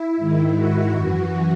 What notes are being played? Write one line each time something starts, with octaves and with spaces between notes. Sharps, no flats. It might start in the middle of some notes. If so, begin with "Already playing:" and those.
Already playing: E4
G#2 D#3
F#4
F#2 E3